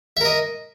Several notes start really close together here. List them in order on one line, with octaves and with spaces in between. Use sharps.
E5 A#4 D#5